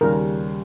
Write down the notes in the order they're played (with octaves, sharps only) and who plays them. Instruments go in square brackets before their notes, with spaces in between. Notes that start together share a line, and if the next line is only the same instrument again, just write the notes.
[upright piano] D#2 C#3 G3 [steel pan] A#4